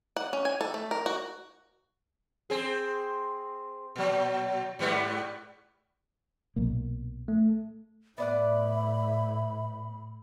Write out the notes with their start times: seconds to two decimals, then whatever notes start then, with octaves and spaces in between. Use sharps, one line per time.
0.16 F#5
0.33 C#4
0.45 G#5
0.61 A4
0.74 A3
0.91 A#4
1.06 F#4
2.50 C4 G#4
3.96 A#2 F#3
4.79 G#2 G3 B3
6.56 B1 A#2 A#3
7.28 A3
8.18 A2 B3 D5 E5 F#5 B5